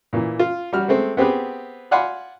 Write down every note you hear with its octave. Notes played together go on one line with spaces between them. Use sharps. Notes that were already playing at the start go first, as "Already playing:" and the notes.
A#2 E3
F4
G3 F#4 F6
G#3 A3 C4
B3 C4 G4 G#4 B4
D5 F5 F#5 G#5 B5 C6